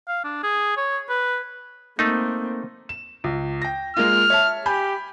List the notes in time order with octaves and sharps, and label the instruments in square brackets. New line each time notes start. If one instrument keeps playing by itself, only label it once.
[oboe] F5
D4
G#4
C#5
B4
[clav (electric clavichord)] A3 D#4 [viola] A#3 C4
[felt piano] E7
C#2
G5 A#6
[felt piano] G#3 A#3 F4 [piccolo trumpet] F6
[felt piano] C#5 E5 A5
[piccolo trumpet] G4 [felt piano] G#5 B5 G6